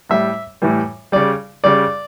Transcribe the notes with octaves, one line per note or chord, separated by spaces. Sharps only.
A2 G3 E5
A2 E3 G3
C#3 G3 D5
C#3 G3 D5